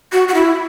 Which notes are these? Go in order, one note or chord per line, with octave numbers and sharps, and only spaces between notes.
F#4
F#4
E4